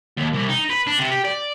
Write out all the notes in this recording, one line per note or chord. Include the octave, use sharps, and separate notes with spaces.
D#2
C2
D#4
B4
D4
C3
G4
D5